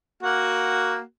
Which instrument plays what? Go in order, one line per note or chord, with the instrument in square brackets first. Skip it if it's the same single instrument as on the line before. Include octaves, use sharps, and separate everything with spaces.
[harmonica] A#3 F#4 F#5